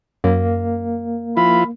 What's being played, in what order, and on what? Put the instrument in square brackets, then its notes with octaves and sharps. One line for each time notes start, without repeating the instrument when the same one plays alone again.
[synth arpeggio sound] F#2 [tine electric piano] A#3
[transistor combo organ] F3 E4 F4 [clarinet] B5